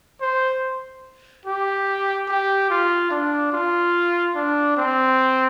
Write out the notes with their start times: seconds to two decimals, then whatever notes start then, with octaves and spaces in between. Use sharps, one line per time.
0.21 C5
1.46 G4
2.28 G4
2.70 F4
3.11 D4
3.53 F4
4.35 D4
4.77 C4